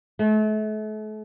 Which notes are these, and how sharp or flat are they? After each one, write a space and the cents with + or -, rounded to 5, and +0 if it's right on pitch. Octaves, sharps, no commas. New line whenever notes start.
A3 -40